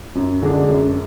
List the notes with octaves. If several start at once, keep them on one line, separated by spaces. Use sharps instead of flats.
F#2
D3 G#3 D4
F#2